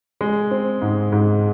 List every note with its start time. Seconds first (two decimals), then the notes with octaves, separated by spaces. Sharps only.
0.21 G#3
0.51 C4
0.82 G#2
1.12 G#2